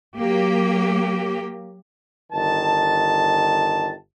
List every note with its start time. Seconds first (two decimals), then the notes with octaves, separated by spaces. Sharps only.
0.18 F#3 A#3 G4
2.32 G1 D#3 A5